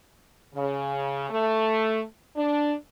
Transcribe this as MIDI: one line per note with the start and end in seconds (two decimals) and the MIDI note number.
0.55 1.28 49
1.30 2.02 57
2.37 2.74 62